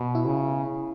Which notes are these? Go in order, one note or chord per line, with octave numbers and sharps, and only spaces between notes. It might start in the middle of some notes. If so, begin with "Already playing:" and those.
Already playing: B2
E4
C#3